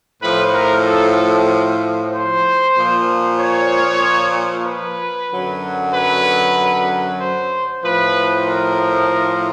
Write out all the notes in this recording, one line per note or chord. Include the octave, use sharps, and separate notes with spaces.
A2 F3 B4
A#4
A4
C5
A#2 F3
C#5
B4
F#2 D3 F#3
B4
C5
A2 F3 B4
A#4